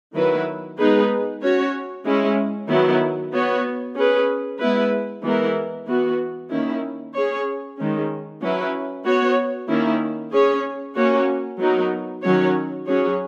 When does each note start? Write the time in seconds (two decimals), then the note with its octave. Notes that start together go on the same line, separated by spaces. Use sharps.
0.14 D#3 F#3 B3 E4 B4
0.78 G#3 B3 D#4 G#4 B4
1.42 C#4 F#4 C#5
2.05 G#3 C#4 E4
2.68 D#3 F#3 B3 E4
3.33 B3 F#4 C#5
3.96 C#4 G#4 B4
4.59 G#3 B3 E4 B4
5.23 E3 G#3 B3 E4 A#4
5.87 E3 B3 F#4
6.50 D#3 A#3 C#4 E4
7.13 C#4 G#4 C#5
7.77 D#3 G#3 C#4
8.41 F#3 C#4 E4 B4
9.04 B3 F#4 C#5
9.68 D#3 A#3 C#4 E4
10.32 C#4 G#4 C#5
10.95 A#3 C#4 F#4 C#5
11.59 F#3 B3 D#4 A#4
12.22 D#3 F#3 C#4 F#4 C#5
12.87 F#3 C#4 G#4 C#5